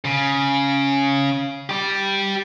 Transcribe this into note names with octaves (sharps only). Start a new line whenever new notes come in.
C#3
G4 D5